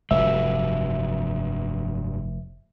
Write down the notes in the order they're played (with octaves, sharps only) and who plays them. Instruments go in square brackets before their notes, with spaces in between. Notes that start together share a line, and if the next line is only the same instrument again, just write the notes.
[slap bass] F1 [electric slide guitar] G2 F#3 G3 [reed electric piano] E5